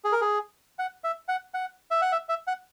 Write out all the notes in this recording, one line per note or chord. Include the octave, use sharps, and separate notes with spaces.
G#4
A#4
G#4
F#5
E5
F#5
F#5
E5
F#5
E5
E5
F#5